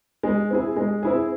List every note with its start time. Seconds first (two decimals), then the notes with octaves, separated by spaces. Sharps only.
0.23 G#3
0.51 C4 E4 G#4
0.76 G#3
1.03 C4 E4 G#4